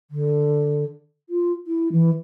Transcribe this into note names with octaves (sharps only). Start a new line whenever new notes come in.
D3
F4
E4
E3